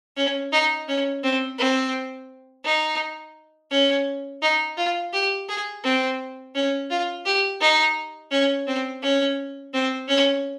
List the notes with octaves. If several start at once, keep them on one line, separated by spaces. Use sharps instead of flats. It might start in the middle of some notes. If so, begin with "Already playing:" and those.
C#4
D#4
C#4
C4
C4
D#4
C#4
D#4
F4
G4
G#4
C4
C#4
F4
G4
D#4
C#4
C4
C#4
C4
C#4